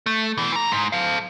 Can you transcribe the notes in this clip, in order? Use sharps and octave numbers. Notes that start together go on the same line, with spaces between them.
A3
B2 E3
E3 A#5
G#2
A4 F5